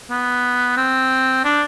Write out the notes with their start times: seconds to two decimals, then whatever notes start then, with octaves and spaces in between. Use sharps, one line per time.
0.10 B3
0.77 C4
1.44 D4